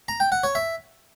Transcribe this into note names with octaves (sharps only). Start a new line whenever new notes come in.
A#5
G5
F#5
C#5
E5